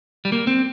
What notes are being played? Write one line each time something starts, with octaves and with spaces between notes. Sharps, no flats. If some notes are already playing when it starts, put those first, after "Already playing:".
G3
A#3
C4